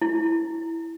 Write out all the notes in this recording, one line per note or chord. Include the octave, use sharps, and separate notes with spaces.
E4